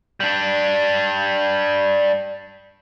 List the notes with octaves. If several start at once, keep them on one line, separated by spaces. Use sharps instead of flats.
G3 D4